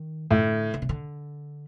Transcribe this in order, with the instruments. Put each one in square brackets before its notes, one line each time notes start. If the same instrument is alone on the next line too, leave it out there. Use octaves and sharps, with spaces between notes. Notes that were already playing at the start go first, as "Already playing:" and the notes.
Already playing: [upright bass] D#3
[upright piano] A2 [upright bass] D3
[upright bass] D3
C#3
D3